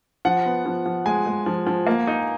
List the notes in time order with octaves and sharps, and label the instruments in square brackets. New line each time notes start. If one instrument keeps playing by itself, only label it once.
[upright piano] F3 [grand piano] F#5
[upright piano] B3
F3
F3
[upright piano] G#3 [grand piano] G#5
[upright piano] G#3
F3
F3
A#3
D#4